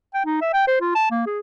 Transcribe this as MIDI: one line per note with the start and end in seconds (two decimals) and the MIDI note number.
0.14 0.25 79
0.26 0.39 63
0.41 0.51 76
0.53 0.63 79
0.67 0.77 72
0.81 0.91 65
0.95 1.07 81
1.11 1.26 58
1.26 1.39 68